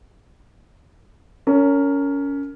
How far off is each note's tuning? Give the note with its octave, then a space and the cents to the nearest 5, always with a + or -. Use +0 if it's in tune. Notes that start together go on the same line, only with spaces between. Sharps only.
C#4 +20 A#4 -20